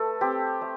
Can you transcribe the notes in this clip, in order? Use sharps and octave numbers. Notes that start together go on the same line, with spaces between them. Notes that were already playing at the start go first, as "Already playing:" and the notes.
Already playing: A3 A4 B4
C4 G4
A3